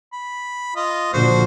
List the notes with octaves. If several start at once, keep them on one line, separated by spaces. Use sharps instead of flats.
B5
F4 D#5
A#2 D3 F3 F#4 C5